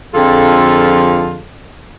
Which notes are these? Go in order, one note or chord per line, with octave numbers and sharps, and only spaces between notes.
F2 D3 F3 F4 G#4 A4